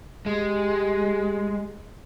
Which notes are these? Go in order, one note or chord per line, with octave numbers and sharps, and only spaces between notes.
G#3 G4